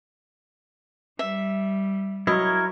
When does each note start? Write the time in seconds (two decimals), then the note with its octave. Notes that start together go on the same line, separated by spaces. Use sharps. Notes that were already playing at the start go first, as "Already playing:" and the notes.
1.19 G3 E5
2.27 F#3 E4 A#4 C#5 D#5